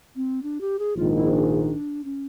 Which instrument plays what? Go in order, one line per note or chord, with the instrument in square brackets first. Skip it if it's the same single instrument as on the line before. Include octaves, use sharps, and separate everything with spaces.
[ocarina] C4
D4
G4
G#4
[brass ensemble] A#1 G#2 D#3 [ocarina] F4
[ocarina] E4
D4
C#4